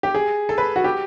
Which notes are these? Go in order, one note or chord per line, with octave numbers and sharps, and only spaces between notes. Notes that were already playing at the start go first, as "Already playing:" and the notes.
G4
G#4
A4
B4
F#4
G4